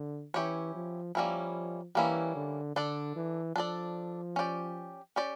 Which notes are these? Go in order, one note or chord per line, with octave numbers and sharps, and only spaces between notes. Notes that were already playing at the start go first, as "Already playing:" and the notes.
Already playing: D3
E3 C#4 E4 G4 C#5
F3
F3 G3 A#3 C#4 E4
E3 G3 A#3 C#4 E4
D3
D3 D4 A4 D5
E3
F3 D4 A4 D5
C#4 G4 D5
C#4 G4 D5